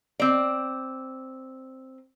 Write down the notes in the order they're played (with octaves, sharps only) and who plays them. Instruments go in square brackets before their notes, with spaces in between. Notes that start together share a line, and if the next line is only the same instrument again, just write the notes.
[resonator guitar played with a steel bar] C4 D5